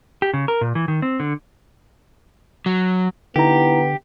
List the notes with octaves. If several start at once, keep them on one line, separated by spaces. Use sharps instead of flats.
G4
C#3
A#4
A#2
E3
D#3
C4
D3
F#3
D3 B3 D#4 E4 G4 A#5